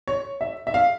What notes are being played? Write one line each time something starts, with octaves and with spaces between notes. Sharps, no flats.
C#5
E5
E5
F5